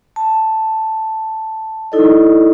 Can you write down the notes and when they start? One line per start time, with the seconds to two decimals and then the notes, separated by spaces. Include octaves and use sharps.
0.16 A5
1.92 D#4 E4 A4 D5 D#5